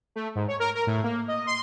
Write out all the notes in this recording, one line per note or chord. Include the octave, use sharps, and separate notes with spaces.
A3
G#2
C#5
A#4
A#4
A2
A#3
D#5
C6